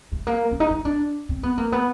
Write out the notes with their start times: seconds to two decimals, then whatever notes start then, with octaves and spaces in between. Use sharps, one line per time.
0.12 A3
0.27 A#3
0.51 C#4
0.60 D#4
0.71 D#4
0.85 D4
1.29 C4
1.43 B3
1.58 A#3
1.72 B3